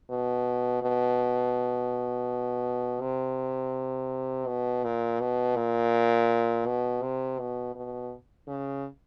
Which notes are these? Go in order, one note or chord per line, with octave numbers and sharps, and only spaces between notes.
B2
B2
C3
B2
A#2
B2
A#2
B2
C3
B2
B2
C#3